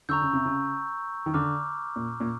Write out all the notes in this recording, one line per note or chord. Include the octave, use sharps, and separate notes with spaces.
D3 A#5 C#6 E6 G6
C#3
C3
C#3
D#3
D3 A#5 D6 F6
A#2
A#2